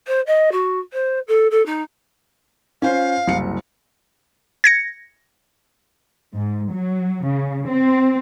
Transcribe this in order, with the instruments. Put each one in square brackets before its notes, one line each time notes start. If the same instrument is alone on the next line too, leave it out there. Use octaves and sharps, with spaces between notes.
[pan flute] C5
D#5
F#4
C5
A4
A4
D#4
[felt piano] C#4 F4 C5 [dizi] F5
[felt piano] F#1 C2 C#7
[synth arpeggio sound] G#6 A#6 C#7
[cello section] G#2
F#3
C#3
C4